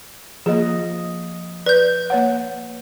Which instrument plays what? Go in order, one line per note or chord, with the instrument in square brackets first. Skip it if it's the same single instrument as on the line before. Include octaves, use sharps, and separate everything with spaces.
[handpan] F3 D#5 [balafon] A#3 G#4
[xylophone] B4 G6 [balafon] D5
[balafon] A#3 C#5 F#5